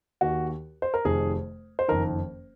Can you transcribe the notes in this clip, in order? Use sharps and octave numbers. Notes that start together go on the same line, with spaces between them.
D#2 D#3 F#4
C5
A#4
F1 F2 C3 D#3 G#4
C5
F#1 F2 D#3 A#4